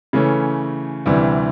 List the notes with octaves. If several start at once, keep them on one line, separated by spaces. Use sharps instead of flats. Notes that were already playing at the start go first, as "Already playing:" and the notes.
C#3 E3 A3 C#4
D2 C3 E3 G3